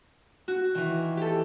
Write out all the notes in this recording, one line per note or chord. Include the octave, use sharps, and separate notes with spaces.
F#4
D#3 E3
G4 A4